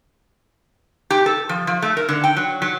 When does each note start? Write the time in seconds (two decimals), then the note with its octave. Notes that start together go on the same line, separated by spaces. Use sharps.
1.10 G4
1.26 A4
1.49 F3
1.67 F3
1.82 A3
1.97 A#4
2.09 D3
2.24 G5
2.36 F#3
2.62 F#3